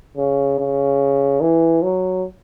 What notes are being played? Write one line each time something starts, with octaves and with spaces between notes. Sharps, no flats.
C#3
C#3
E3
F#3